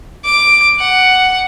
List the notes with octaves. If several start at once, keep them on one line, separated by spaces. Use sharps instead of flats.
D6
F#5